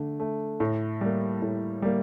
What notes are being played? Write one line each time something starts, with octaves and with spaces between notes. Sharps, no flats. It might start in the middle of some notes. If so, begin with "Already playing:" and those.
Already playing: D3 A3
A3
A2
G3 A#3
A2
G3 A#3